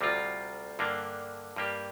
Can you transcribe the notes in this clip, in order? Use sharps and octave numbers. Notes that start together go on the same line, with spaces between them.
D2 C3 G3 C4 F4
G2 D3 A#3 D4
G2 G3 A#3 G4